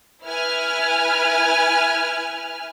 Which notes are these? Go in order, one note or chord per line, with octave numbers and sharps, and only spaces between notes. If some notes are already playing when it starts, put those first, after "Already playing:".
E4 B4 G#5 F6